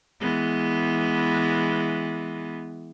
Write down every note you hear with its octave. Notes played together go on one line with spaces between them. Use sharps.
E3 G#3 B3